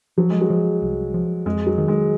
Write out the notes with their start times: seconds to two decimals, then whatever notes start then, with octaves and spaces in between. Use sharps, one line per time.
0.18 F3 F#3
0.30 G#3
0.41 F#3
0.50 F3
0.82 C2
1.14 F3
1.46 F2 G#3
1.67 F#3
1.78 D#3
1.88 G#3